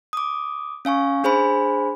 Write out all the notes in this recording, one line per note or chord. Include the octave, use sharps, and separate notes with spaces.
D6 D#6
C#4 F5 G#5 C#6
D4 G#4 C5 G#5 B5